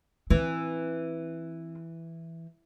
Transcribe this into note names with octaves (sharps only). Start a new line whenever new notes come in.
E3 C4